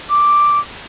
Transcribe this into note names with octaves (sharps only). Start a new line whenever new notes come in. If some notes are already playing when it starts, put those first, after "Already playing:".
D6